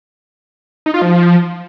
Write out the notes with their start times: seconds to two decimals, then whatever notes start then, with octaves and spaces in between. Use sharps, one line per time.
0.86 D#4
0.94 F4
1.02 F3